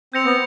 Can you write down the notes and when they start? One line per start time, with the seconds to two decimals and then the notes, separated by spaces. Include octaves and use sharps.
0.14 C4 G6 A#6 C#7 F7
0.25 B3